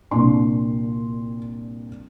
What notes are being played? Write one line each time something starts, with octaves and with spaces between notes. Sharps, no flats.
C2 A#2 A#3 D4 C6